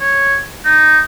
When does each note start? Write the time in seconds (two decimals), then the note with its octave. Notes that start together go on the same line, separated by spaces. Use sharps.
0.01 C#5
0.65 D#4